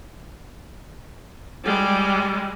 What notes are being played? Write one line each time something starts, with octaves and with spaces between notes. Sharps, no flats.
G3 G#3